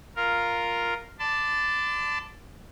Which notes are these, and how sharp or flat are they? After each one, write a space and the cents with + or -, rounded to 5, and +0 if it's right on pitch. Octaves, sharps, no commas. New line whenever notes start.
F4 +0 A#4 +0 F5 +0
D5 +0 A5 +0 C6 -45